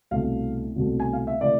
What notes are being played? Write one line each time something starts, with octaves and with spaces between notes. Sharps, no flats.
C2 B2 A3 F5
C2 B2 A3
G#5
F5
E5
C3 E3 A3 D5